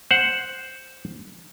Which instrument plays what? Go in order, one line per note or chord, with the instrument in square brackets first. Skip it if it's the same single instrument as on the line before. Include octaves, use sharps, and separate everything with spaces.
[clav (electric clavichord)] C5 F#5